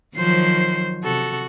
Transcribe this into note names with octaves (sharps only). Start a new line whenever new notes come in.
D#3 F3 F#3 C5 C7
C3 F#4 A4